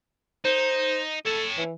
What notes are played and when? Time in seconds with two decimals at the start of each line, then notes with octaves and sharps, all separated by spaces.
0.45 D#4 C5
1.26 A4 C#5 A5
1.57 E3